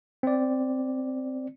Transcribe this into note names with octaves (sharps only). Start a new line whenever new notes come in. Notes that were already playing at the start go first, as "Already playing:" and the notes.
C4 D5